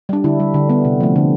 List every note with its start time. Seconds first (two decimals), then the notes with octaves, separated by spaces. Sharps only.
0.09 G3 D4
0.24 D3 E4
0.39 G3
0.54 D3
0.69 G3 B3
0.85 C3
1.00 F3 A3
1.16 D3